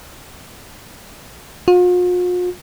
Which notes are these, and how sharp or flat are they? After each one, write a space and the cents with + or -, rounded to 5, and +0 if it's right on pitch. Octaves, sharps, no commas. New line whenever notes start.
F4 +45